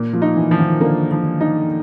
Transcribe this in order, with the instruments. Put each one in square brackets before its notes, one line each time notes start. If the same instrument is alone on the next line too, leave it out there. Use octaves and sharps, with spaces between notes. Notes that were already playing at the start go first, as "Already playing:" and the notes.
Already playing: [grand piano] A#2
[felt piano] F3
[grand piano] D#4
[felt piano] E3
[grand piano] F3
[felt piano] D#3
[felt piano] D3 [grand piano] A#3
[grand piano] F3
D#4